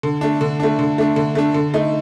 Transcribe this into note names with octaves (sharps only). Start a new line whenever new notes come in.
D3
A3 D4
D3
A3 D4
D3
A3 D4
D3
A3 D4
D3
A3 D#4